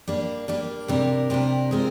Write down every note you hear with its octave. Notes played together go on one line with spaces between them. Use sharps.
G3 A#3 D4
G3 A#3 D4
C3 G3 D4 G4 A#4
C3 G3 D4 G4 A#4
G#3 C4 F4 A#4